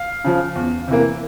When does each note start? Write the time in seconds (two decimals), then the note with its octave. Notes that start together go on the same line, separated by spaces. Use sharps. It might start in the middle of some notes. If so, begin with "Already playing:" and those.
Already playing: F5
0.24 C#3 F3
0.56 E2
0.88 C3 E3 A#3